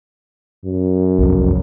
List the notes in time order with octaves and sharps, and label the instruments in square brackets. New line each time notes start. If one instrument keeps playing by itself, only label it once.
[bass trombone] F#2
[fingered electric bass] G1 C2 F2